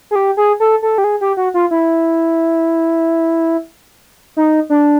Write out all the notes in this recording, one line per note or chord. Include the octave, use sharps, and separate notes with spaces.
G#4
G4
G#4
A4
A4
G4
G#4
G4
F#4
F4
E4
D#4
D4